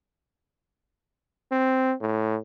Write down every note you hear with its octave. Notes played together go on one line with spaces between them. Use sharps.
C4
A2